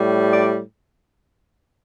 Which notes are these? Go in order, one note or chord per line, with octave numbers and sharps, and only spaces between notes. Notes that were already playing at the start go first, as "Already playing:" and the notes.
Already playing: A2 G3
D5